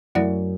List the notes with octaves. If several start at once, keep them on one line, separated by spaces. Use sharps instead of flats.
F#2 F#3 A3 E4 D5 F#5